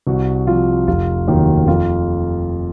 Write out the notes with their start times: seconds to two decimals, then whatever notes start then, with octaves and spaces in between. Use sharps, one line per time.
0.07 C2 F#4
0.47 C3 F3 F4
0.87 F1 F4
1.27 D#2 D#3 F#3
1.67 F2 F4